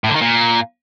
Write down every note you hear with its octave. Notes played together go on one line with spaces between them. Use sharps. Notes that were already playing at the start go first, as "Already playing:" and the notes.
A2
D3
D#3
A#2